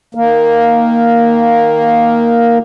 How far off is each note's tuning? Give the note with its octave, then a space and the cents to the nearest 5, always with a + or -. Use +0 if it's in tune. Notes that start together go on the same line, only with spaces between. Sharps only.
D#3 +0 A#3 +0